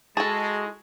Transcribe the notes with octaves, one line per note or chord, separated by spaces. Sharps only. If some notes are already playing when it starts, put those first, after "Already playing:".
G#3 E4 F#4 G#4 A4 A5